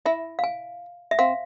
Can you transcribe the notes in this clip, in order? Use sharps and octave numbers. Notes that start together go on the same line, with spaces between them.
E4 E5
F5
G#5
E5
C4 F5